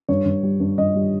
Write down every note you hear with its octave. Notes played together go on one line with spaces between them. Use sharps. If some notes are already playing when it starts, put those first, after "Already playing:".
G2 C#5
G2
G3
G2
G2 D#5
G3